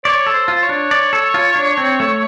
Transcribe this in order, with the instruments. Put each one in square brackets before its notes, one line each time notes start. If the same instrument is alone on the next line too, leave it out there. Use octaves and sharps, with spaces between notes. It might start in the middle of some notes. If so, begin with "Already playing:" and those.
[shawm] C#5 [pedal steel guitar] D5
[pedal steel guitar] A4
[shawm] C5
[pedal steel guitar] F4
[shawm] C#5
[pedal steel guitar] D4
D5
A4
F4
D4
C4
A3